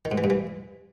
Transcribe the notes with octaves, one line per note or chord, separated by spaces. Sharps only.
D#3
G#2
E3
G2
E3